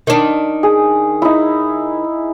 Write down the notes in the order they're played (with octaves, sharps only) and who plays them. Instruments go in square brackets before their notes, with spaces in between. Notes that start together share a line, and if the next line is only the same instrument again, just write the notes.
[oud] D#3 D4
[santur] G#4
D#4 E4